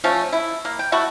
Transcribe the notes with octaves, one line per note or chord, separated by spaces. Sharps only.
F3 A3 C#4
E4
A#3
G5
A3 E4 F#4